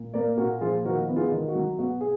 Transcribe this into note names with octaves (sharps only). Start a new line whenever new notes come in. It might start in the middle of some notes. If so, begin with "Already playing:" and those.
Already playing: A#2
A#3 A#4 D5
A#2 F#4 A#4
F3 F4 G#4
D#3 F#4 A#4
B3
F4 G#4
D#3
F#4
F#3
B2 F#4
G#4